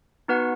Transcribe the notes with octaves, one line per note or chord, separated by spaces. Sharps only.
B3 D#4 F#4 B4 F#5